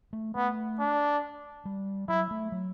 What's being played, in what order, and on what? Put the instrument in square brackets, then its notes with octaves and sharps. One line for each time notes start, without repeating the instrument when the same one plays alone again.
[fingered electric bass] A3
[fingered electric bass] A3 [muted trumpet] B3
[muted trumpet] D4
[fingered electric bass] G3
[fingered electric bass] F#3 [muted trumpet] E4
[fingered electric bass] A3
F#3